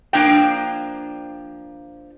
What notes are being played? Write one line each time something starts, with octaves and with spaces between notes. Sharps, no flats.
F3 A#3 D4 F5 G5